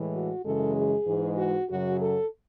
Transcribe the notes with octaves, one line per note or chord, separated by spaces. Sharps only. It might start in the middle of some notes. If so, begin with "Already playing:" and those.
Already playing: A2 E3 G#3
F#4
F#2 C#3 E3 G#3 A4
G#4
G#2 E3 G#3
F#4
F#2 C#3 F#3 F#4
A4